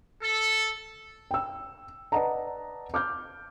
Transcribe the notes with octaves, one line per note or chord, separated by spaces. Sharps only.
A4
G5 E6
B4 D5 D#5 F#5 A5 A#5
D6 F6 G6